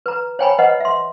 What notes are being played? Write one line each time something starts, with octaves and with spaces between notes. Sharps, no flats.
B4 A#5
C5 C#5 G5 G#5 A#5 B5
B4 C5 D#5 F#5
E5 C6